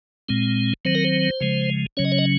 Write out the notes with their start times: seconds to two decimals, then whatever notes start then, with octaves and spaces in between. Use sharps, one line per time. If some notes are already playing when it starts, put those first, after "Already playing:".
0.29 A#2 G#3 C4
0.85 D#3 F#3 C4 C5
0.95 A#4
1.05 C5
1.41 C#3 F3 G#3
1.97 C#3 F#3 C#4 C#5
2.05 D#5
2.12 C#5
2.18 D#5